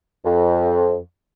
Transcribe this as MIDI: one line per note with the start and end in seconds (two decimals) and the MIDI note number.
0.25 0.98 41